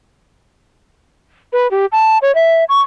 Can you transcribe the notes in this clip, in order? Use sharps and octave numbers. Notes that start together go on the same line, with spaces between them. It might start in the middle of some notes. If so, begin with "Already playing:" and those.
B4
G4
A5
C#5
E5
C#6